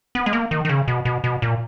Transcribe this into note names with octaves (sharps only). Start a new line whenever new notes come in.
B3
G#3
A#3
D#3
D#3
C#3
B2
B2
B2
A#2